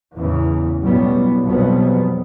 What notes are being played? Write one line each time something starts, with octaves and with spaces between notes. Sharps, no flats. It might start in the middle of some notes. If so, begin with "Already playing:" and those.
E2 A2 C#3 E3
B1 F#2 A2 F#3 G3 B3
B1 F2 B2 F#3 G3 B3